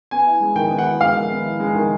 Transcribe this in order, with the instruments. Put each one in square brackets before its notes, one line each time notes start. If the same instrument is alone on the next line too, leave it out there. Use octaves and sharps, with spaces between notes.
[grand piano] B3 [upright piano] G#5
[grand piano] E4
G#3
[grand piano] D#3 [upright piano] G5
[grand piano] B3
[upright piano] F#5
[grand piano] E4
[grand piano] G#3 [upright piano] F5
[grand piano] D#3
B3
E4
G#3
D#3